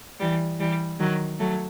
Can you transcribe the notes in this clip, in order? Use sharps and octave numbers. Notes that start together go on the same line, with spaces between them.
E3 G3
E3 G3
D#3 F#3
F#3 A3